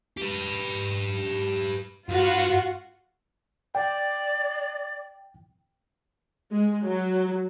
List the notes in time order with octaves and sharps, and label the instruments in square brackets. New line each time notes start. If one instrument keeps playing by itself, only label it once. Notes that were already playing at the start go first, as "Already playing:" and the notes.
[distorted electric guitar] G4 B4
[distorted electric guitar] G2 B4 [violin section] F4 F#4
[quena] D5 [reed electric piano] G5
[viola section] G#3
F#3